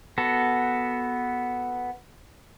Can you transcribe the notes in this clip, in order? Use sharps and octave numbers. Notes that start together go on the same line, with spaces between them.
B3 F#4 A4